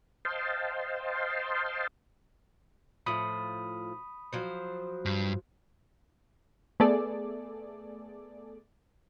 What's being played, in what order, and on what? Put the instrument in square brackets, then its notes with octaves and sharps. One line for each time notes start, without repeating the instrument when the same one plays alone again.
[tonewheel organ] C5 D#5 F5 G5 A5 C6
[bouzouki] A2 F3 [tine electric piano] B5 D#6
[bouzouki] F3 F#3 C5
[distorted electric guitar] G2
[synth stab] A3 B3 G#4 A4 D5